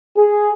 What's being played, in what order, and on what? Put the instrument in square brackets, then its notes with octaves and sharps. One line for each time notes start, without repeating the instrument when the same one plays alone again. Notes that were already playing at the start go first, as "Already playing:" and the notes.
[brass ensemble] G#4